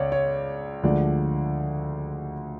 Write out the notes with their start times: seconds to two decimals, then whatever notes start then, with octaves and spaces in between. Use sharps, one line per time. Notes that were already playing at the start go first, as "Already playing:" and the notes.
Already playing: C#2 C#4 C#5 D5 F5
0.12 C#5
0.83 D2 D3 F3 G#3 D5